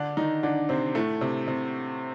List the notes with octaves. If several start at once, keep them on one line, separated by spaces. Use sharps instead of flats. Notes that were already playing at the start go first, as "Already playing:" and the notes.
Already playing: D3 D4
D#3 D#4
D3 D4
C3 C4
A2 A3
C3
C3